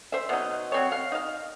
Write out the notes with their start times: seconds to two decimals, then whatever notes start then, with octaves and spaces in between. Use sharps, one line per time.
0.12 C5 E5
0.29 B2 F#3 D#4
0.72 F#3 C4 C#5
0.92 F5
1.12 D#4 F5